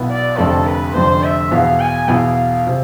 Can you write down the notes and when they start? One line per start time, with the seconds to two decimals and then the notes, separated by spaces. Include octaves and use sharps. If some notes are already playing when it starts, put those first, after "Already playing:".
Already playing: B1 B2 B3 E4
0.10 D5
0.38 F1 F2 D3 A4
0.66 B4
0.95 F1 F2 D3 C5
1.23 E5
1.51 E2 B2 B3 E4 F5
1.80 G#5
2.08 E2 B2 B3 E4 F5
2.67 C3